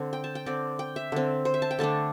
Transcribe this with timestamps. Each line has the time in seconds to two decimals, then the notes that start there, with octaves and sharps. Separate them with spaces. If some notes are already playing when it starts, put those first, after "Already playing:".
Already playing: D3 C4
0.13 G5
0.24 A5
0.35 G5
0.46 D3 C4 D5
0.79 G5
0.96 E5
1.12 D3 C4
1.45 C5
1.54 E5
1.62 A5
1.71 G5
1.79 D3 A3 D4 A5